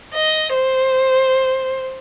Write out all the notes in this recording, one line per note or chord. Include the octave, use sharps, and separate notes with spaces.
D#5
C5